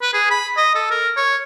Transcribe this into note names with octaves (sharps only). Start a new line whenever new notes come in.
B4
G#4
B5
D#5
A4
A#4
C#5